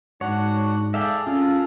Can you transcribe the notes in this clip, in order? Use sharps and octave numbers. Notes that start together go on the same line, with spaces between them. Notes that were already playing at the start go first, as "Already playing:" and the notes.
G#2 D4 F#4 C#5 F#5
G#4 A4 D5 E5 F5 G5
C#4 F4 G#4 A4